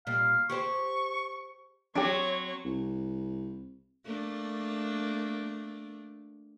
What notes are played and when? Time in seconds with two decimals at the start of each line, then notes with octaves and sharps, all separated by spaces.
0.07 A#2 G3 F5
0.50 G4 G#4 C5 C#6
1.96 F#3 C4 D4 G4 C#5 C#6
2.65 C2
4.05 A3 A#3 D4